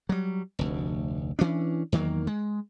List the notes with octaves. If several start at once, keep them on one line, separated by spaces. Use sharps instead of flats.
F#3 G3
F1 D2
E3 C#4 D4
E2 D#3 F#3 A#3
G#3